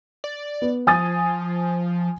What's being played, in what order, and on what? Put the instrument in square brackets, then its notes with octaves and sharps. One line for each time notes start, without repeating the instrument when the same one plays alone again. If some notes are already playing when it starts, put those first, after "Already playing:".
[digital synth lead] D5
[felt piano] B3
[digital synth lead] F3 [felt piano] G#5 D#6 A6